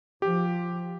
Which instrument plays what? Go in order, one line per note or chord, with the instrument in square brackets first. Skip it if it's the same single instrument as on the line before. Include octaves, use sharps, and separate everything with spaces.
[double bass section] F3 [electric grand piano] G4